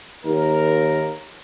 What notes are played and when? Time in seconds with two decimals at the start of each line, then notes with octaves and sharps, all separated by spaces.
0.25 D#2 A#4